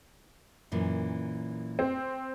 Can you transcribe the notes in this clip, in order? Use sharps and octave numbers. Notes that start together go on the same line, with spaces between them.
F#2 A#2 E3
C4